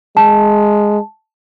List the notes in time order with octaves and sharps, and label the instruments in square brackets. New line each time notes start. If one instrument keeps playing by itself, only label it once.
[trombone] G#3 [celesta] A5